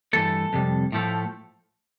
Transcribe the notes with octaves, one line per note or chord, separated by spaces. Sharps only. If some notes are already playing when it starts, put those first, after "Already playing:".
G2 E3 A3 A4
F2 C3 G3
A2 F3 A3